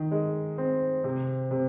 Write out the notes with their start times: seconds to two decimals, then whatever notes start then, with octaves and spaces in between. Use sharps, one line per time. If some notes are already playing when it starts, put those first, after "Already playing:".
Already playing: D#3
0.11 G#3
0.58 C4
1.04 C3
1.51 C3